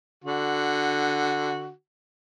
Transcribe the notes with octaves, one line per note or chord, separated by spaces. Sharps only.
D3 F#4